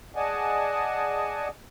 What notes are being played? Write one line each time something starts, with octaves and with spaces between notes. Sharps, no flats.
G#4 D5 D#5 F#5 G#5 A5